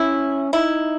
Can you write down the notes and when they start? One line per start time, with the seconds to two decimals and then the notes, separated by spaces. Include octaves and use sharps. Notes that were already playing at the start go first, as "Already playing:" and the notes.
Already playing: C#4 E4
0.53 D#4 E4